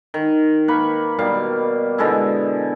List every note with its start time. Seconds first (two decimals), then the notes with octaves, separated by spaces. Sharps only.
0.14 D#3
0.68 A#3 B4 B5 C#6
1.19 B2 G3 A#3 F5
1.98 B2 D3 G#3 E4